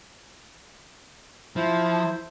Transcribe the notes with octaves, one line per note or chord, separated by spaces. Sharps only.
F3 E4 C5